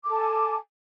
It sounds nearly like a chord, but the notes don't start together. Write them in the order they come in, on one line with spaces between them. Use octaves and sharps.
D6 A4 A5 G#5